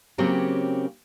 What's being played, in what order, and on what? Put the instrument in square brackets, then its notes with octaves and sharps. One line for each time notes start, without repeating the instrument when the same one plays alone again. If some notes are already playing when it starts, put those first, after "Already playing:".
[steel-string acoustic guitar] C#3 F#3 A#3 C4 C#4 G4